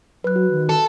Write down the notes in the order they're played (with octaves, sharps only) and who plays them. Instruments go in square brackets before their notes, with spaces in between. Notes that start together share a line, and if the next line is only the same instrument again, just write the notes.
[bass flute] F#3 [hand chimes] B4 F#6
[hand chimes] F#4
[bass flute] D#3
[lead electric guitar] A4